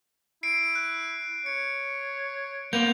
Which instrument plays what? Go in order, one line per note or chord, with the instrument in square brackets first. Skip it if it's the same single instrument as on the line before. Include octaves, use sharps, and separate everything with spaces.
[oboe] E4 [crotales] C7 D7
[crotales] F#6
[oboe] C#5 [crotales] C#7
[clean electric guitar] A#3 B3 [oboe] C5 [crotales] G6 F7